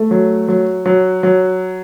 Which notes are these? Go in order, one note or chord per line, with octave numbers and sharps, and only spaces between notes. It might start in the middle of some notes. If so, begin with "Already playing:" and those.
Already playing: A3
F#3
F#3
F#3
F#3